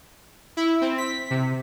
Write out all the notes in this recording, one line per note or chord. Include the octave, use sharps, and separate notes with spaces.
E4
C4
B6
C3